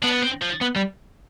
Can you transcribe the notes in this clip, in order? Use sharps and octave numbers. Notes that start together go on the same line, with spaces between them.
B3 D4
C4
F3
B3
G3